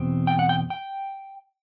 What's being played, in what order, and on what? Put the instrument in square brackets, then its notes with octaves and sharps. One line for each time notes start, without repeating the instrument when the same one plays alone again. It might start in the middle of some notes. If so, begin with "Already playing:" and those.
Already playing: [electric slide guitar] E2 B2 C4
G5
F#5
G5
G5